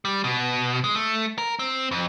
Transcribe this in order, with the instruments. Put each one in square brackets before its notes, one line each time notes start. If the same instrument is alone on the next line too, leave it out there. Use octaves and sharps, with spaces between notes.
[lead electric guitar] G3
B2
G#3
A3
A#4
C4
F2